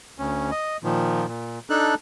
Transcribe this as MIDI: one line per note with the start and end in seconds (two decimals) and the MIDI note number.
0.19 0.51 38
0.19 0.51 61
0.51 0.77 75
0.84 1.26 46
0.84 1.26 51
0.84 1.26 53
1.27 1.59 46
1.70 1.95 62
1.70 1.95 63
1.70 1.95 69
1.70 1.95 90